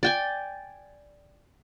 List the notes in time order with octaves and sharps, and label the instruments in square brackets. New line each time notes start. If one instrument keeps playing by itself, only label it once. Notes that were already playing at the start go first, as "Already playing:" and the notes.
[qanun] D5 G5 G#5